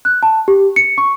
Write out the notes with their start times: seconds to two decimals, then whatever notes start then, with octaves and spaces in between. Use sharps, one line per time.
0.05 F#6
0.23 A5
0.48 G4
0.76 C#7
0.98 C#6